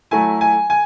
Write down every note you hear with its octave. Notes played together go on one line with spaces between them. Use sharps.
F#3 A3 E4 G#5
G#5
G#5